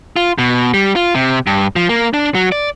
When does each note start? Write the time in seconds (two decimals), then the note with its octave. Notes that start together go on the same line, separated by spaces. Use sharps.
0.16 F4
0.38 B2
0.74 G3
0.96 F4
1.15 C3
1.47 G2
1.76 F3
1.89 A#3
2.14 D4
2.35 F#3
2.52 D5